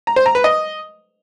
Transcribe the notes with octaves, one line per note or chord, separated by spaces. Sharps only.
A#5
C5
A#5
B4
D#5